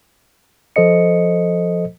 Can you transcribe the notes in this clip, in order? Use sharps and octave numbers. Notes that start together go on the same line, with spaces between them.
F3 A4 C5 D#5 C#7